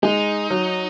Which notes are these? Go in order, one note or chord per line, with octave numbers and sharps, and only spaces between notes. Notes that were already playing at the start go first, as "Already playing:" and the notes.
G#3 D#4
F#3